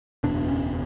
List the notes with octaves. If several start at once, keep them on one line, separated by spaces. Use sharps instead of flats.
F#1 E2 B2 D4
C#4